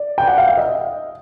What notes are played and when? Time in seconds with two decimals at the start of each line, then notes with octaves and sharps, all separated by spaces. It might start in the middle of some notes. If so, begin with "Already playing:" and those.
Already playing: D5
0.18 G5
0.27 F#5
0.38 F5
0.48 E5
0.57 D#5